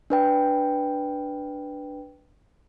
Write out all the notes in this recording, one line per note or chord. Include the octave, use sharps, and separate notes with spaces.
D4 B4 G5